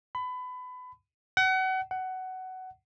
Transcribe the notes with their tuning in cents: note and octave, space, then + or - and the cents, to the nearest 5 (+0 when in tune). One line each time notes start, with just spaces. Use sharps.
B5 +25
F#5 +30
F#5 +15